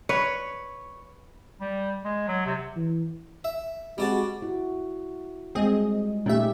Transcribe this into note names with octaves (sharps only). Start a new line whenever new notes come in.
B4 C#5
G3
G#3
F#3
C3
E3
E5
G3 G#3 C4 F#4 D5 A5
E4 F#4
G3 G#3 C4 G#4 D#5
A#2 A3 C#4 D#4 G4 E5